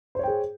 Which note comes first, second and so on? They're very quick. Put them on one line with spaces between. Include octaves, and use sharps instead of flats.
C5 C#5 G5 G#4